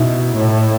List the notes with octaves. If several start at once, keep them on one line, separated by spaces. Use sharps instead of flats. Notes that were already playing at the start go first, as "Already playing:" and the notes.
Already playing: B2 D#4 E4
A2